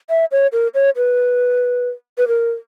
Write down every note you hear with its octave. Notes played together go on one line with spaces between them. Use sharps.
E5
C#5
A#4
C#5
B4
B4
A#4